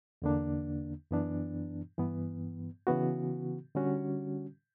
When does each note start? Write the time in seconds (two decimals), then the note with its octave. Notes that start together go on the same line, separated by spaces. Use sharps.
0.22 E2 D3 A#3 D4
1.11 F#2 E3 B3 D4
1.98 G2 E3 B3
2.87 C#3 E3 B3 F#4
3.75 D3 G3 C#4 F#4